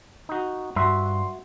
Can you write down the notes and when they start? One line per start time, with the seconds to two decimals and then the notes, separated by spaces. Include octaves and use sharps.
0.29 D#4 F#4
0.76 G2 F#4 E5 C6